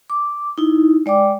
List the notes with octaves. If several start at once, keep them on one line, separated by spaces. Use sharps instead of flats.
D6
D#4 E4
G#3 D5 G5 D6